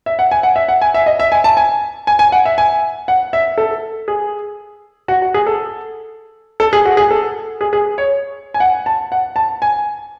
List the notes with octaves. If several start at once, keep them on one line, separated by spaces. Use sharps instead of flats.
E5
F#5
G#5
F#5
E5
F#5
G#5
E5
D#5
E5
G#5
A5
G#5
G#5
G#5
F#5
E5
G#5
F#5
E5
A4
G#4
F#4
F#4
G#4
A4
A4
G#4
F#4
G#4
A4
G#4
G#4
C#5
G#5
F#5
A5
F#5
A5
G#5